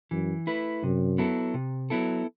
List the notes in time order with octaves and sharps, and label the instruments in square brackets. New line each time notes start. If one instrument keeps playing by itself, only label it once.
[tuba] F#2 [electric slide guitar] E3
[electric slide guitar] A3 E4 B4
[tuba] F#2 [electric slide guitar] C3
[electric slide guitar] F#3 B3 E4 A4
C3
F#3 B3 E4 A4